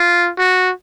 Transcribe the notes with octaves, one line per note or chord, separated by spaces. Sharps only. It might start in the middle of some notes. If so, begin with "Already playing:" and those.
Already playing: F4
F#4